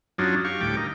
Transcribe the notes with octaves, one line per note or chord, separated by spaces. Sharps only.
F#2 F#3 D4 D#4 F4
G4 F5 C#6
D2 A2 G3 G5 D6
D#4 A#4